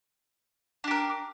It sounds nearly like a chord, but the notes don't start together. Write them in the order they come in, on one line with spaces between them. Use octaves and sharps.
D4 G4 A#4